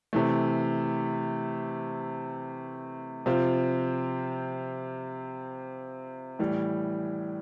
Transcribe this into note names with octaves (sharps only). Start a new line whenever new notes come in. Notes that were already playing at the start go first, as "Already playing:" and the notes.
C3 E3 A3
C3 F3 C4 F4
A2 E3 G3